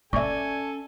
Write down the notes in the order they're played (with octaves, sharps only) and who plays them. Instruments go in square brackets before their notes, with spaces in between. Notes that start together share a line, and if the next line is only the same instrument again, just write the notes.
[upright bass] C#4 [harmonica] A4 G#5 [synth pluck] D5 [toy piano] E5 C#6